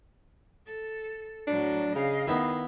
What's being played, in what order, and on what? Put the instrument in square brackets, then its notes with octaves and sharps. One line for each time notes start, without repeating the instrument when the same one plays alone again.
[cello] A4
[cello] A2 F#3 [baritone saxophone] D4
[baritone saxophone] C#3 [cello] D#5 F5
[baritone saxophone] D#3 [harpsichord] B3 E4